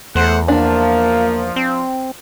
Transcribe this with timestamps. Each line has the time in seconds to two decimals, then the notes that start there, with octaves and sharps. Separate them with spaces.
0.15 E2 A3 C5 F#5
0.48 F3 A#3 D4
1.56 C4